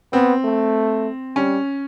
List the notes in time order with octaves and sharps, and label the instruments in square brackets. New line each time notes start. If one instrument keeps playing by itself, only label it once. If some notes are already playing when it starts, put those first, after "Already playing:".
[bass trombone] B3 [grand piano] C4
[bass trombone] A3
[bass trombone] G3 [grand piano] C#4